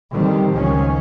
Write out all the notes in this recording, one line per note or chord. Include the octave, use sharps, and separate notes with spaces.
D3 D#3 G3 C4
C#2 D#3 F3 C#4